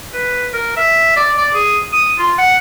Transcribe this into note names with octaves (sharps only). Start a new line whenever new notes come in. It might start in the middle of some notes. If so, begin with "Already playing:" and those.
B4
A#4
E5
D5
D5
G#4
D#6
F4
F#5